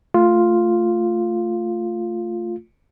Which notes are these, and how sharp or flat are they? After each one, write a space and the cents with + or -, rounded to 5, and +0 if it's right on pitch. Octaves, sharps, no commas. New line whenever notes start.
A3 +10 F4 +0